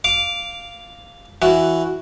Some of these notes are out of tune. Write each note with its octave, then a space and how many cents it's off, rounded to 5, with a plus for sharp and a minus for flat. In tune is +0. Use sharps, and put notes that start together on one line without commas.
F5 +0 D6 -10
E3 +0 F#4 +0